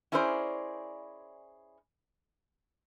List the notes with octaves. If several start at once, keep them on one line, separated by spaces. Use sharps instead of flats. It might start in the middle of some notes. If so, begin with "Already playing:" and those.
C#4 E4 G#4 A#4 C5 D5